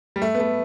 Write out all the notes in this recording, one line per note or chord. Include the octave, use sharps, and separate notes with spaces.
G3
A3
B3
A3